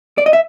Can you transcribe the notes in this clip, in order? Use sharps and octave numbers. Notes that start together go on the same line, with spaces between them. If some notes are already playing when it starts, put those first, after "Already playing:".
D5
D#5
E5